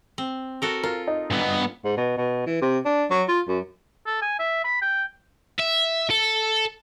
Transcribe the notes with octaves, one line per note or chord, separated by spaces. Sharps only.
C4
F#4 A4 A#4
F4 A#4
D#4
G2 B3
G#2
B2
B2
E3
C3
D4
F#3
F4
F#2
A4
G#5
E5
B5
G5
E5
A4